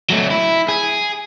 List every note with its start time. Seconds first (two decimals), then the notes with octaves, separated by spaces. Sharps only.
0.10 F#3 A3
0.30 E4
0.69 G#4